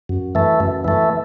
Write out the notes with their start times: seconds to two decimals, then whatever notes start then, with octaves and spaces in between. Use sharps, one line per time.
0.09 F#2
0.35 E3 A3
0.60 F#2
0.84 E3 A3